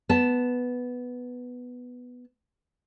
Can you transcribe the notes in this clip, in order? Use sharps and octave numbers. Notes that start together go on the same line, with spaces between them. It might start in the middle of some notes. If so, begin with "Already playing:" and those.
B3 A5